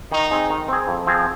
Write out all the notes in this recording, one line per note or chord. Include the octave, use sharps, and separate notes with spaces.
D#3 D#4
C4 G#4
D#3
C4 G#4
F2
F3 C4 G#4